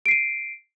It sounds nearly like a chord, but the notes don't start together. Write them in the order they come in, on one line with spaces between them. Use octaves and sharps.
D7 C7 D#7